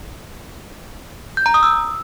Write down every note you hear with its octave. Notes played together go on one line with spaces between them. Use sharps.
G6
A#5
D#6
E6